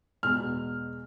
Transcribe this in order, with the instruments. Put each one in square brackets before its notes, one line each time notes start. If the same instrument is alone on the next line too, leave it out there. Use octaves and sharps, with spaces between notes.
[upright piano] E2 B2 G#3 F6